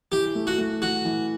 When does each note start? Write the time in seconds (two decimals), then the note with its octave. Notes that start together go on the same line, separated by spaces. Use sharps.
0.12 E3 G4
0.35 A3
0.47 F#4
0.58 A3
0.82 E3 F#4
1.05 E3